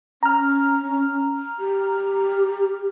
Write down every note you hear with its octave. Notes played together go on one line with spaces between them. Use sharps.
C#4 A#5 F6
G4